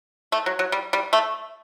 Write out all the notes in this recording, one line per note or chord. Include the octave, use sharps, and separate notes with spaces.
A3
F#3
F#3
G3
G3
A3